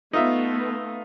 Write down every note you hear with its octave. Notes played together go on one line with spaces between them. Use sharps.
A3 B3 D#4 F4 E5